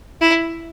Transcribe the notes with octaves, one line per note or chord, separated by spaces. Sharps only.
E4